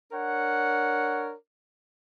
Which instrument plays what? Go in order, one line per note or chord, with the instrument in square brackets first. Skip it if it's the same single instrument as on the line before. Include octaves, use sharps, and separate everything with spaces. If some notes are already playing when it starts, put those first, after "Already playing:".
[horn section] D4 A#4 C#5 F#5